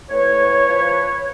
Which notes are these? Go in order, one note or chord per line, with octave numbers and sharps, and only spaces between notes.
A2 B4 C#5
A2
F3